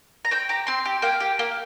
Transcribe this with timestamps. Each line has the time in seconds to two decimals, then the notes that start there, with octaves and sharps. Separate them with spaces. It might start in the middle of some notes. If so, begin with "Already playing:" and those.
0.25 A#5
0.31 C4 G5
0.49 G4 A#5
0.67 C4 C6
0.85 G4
1.02 A#3 G5
1.20 G4
1.39 A#3